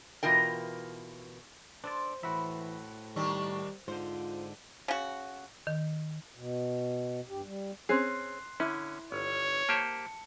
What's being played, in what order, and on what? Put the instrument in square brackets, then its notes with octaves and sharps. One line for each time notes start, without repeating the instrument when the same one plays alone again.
[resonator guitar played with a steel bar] B2 E3 F4 A#4 G5
[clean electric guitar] D4 A4 D5 [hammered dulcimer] C5
[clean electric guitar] A2 F#4 E5 [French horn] E3 [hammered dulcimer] B5
[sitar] D#3 C4 D4 [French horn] G3
[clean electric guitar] G#2 D3 [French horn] F4 [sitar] C5
[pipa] C#3 F#4
[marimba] D#3
[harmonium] B2
G2 G4
G3
[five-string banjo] C4 C#4 G#4 [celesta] C6 F#6 C7
[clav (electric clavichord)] D3 C#4 [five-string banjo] E4
[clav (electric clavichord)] G1 [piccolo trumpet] C#5
[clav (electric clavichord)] A#3 G4 C5 [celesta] A5 C#7